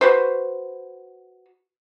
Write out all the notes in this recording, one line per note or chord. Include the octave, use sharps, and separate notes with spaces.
F#4 B4 C5